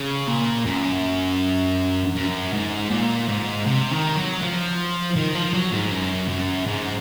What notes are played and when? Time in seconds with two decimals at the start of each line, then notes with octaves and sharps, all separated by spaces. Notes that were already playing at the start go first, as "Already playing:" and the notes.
Already playing: C#3
0.28 A#2
0.66 F#2
2.16 F#2
2.53 G#2
2.91 A#2
3.28 G#2
3.66 C3
3.91 D#3
4.16 F#3
4.42 F3
5.16 D#3
5.35 F3
5.54 F#3
5.72 G#2
5.91 F#2
6.29 F#2
6.67 G#2